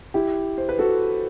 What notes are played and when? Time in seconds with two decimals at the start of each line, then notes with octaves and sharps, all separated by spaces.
0.14 E4 G4
0.58 C5
0.69 B4
0.79 F#4 A4